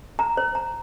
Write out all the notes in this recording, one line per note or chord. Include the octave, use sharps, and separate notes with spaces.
A#5
C5
A#5